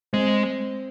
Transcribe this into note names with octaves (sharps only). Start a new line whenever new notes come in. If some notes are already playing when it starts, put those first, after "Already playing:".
G#3 C4